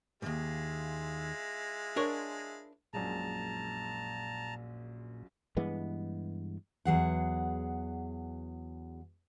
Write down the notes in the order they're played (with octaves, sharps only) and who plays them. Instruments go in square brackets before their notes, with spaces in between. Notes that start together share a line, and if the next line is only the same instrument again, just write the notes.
[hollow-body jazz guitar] D#2 G#2 [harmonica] G#3 E4 F4
[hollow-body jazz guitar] D4 A#4 C#5
[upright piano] A#1 F#2 G#3 [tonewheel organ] A#2 [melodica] A5 A#5
[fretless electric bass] G2 E3 G#3 B3
[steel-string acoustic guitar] E2 F#3 G#4 F#5